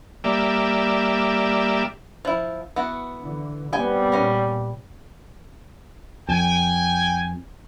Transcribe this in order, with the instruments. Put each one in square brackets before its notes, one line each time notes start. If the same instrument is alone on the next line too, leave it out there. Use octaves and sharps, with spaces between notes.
[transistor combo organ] G3 A#3 D5 E5
[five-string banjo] F3 E4
B3 E4 F#4
[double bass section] D3 E3
[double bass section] G2 B3 C4 [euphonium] G3 [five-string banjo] D#5 G5 G#5
[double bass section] A#2 [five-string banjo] A#3 C#4
[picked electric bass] F2 [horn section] G5 G#5